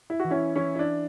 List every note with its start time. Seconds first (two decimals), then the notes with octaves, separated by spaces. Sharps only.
0.10 E4
0.20 E3 F#4
0.30 C#4 E4
0.56 E3 C#4 E4
0.75 E4
0.79 D4